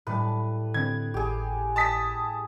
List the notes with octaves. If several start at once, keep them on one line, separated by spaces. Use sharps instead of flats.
A2 G3 B4 A5
D3 C4 G#6
G#1 G4 G#4
A5 D#6 B6